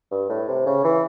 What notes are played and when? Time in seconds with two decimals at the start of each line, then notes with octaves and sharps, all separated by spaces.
0.11 G2
0.30 A2
0.48 C3
0.66 C#3
0.84 E3